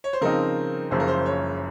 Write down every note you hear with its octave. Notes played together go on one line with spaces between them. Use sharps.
C#5
C5
C#3 F3 C4 D#4 A#4
F#1 F#2 C#3 F3 C5
A#4
C5
C#5